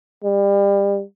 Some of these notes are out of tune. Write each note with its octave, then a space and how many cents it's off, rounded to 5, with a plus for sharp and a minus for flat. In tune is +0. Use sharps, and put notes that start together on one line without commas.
G3 +30